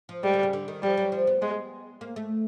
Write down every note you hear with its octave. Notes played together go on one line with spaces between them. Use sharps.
F3
G3 G#3
D3
C#3
D3
D#3
F3 G3
F#3
F3
B3
G#3 B3
A#3
A3